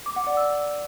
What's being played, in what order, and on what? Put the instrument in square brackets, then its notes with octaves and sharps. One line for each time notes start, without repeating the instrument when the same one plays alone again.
[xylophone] D6
F#5
D5
E6